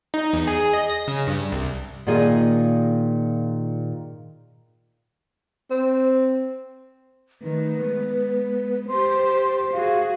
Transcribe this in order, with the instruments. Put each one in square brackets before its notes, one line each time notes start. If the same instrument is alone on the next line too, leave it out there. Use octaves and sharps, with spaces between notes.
[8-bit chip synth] D#4
E2
G#4
D#5
A#6
C#3
G2
C2
[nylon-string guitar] A#2 D#3 F4 G#4 D#5
[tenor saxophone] C4
[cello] D#3 A3 [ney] B4
[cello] G#3 B3
[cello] G4 C5 [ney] C6
[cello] F#4 G#4 [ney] F5